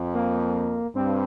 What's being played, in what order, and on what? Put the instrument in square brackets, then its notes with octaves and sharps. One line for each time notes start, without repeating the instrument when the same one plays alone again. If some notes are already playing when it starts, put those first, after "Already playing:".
Already playing: [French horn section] F2
[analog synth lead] A#3
[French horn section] G2 [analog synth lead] C4